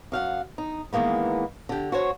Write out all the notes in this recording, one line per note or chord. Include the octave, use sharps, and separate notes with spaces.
F#2 F5 F#5
D#4
D#3 E3 G#3 A#3 B3
D3 G4
F#4 C5 C#5